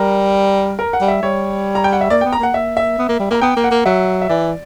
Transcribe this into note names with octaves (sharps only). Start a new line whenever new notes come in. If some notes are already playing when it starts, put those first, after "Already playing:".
Already playing: G3 A#4
A#4
F#5
G3
E5
G3 C#5
A#5
G5
F#5
E5
A#3 D5
B3 G5
A#5
A#3 F#5
A#3 E5
E5
B3
A#3
G3
A#3 A#5
B3 G5
A#3
F#5
A#3
F#3 E5
E5
E3 D5